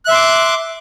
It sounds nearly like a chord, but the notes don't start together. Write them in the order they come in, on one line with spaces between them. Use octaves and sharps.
F#6 E5 C6 D6